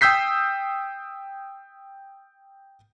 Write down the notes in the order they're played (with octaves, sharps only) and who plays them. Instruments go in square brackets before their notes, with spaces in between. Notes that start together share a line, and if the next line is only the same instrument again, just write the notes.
[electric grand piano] G5 D#6 E6 G6 B6 C7